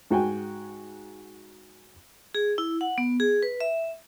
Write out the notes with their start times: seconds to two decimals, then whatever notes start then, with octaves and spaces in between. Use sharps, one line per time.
0.11 G#2 F#4 G5 G#5
2.35 G#4
2.58 E4
2.81 F#5
2.98 B3
3.20 G#4
3.43 B4
3.61 E5